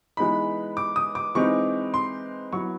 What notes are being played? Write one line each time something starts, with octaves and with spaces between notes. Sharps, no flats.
E3 G#3 B3 D#4 B5
D6
D#6
D6
E3 G#3 C4 D#4 C#6
C6
F#3 B3 E4 C#6